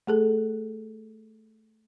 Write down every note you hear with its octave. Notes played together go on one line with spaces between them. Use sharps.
A3 G#4 A4